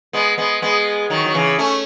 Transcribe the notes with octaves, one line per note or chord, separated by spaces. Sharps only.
G#3 B3
G#3 B3
G#3 B3
D#3 F#3
F#3
C#3 E3
A3 C#4